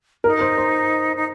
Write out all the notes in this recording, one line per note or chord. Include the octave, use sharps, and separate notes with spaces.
D#4 A#4
C5
C5
D#4